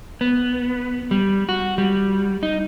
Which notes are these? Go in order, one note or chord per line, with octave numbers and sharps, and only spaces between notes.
B3
G3
F#4
G3
D#4